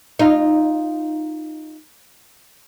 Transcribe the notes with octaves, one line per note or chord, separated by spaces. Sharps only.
D#4 F4